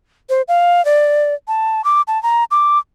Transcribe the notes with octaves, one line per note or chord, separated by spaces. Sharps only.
C5
F5
D5
A5
D6
A5
A#5
D6